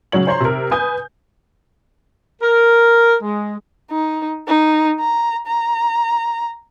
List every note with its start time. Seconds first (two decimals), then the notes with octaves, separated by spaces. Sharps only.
0.12 C#3 F#3 C#5 F#7
0.27 C5 C#5 A#5 C6
0.40 C3 A#4
0.71 B4 G#5 D#6 G6
2.42 A#4
3.22 G#3
3.91 D#4
4.48 D#4
5.00 A#5
5.47 A#5